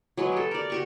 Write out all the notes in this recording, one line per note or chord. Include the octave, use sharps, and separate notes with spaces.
F#3 G#3 G#4 B4
G4 A4
A#4 D5
F#4 G4 C#6